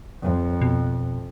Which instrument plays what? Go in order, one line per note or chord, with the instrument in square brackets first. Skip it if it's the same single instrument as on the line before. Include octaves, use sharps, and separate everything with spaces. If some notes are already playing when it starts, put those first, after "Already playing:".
[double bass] F2
[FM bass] B2